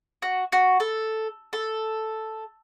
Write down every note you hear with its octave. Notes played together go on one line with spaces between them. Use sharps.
F#4
F#4
A4
A4